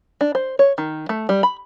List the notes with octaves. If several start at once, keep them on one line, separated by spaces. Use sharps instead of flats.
D4
C5
C#5
D#3
A3
G3
B5